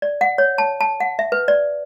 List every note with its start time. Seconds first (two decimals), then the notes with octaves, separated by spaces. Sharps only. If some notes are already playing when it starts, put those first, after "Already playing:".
0.02 D5
0.21 F#5
0.38 C#5
0.58 A5
0.81 A5
1.00 F#5
1.19 E5
1.32 B4
1.48 D5